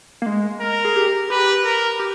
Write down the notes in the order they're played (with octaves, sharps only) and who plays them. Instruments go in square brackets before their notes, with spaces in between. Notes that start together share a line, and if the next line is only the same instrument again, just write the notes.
[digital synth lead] A#3
G#3
[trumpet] A#4
[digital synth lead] G#4
G4
[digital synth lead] G4 [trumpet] B4
[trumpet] A#4
[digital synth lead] G4